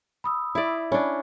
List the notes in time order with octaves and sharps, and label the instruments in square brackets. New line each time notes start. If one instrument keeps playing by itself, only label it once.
[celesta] B5 D#6 E6
[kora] E4 D5
[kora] C#4 D4 [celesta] B5